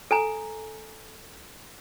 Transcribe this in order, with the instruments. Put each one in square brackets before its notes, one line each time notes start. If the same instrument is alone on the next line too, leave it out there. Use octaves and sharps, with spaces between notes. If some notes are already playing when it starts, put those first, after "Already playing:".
[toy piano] A4 G#5 A#5